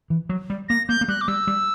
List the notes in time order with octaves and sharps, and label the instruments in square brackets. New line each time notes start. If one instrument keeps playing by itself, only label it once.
[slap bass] E3
F#3
G3
[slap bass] A#3 [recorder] A#6
[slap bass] A#3 [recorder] G6
[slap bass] A#3
[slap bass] G3 [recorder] F#6
[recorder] D6
[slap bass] G3 [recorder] E6
[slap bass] G3